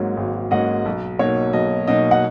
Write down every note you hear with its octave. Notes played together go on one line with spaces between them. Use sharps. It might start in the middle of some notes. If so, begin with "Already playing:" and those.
Already playing: G#1 G#2 F#3 A#3 C#4
G#1
G#2 F#3 A#3 C#4 D#5 F#5
B1
B2 F#3 A#3 D#4 C#5
B1 D#5
B2 F#3 A#3 D#4 D#5
F#5